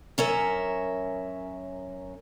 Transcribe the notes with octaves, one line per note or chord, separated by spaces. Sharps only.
F#2 C#4 A#4 E5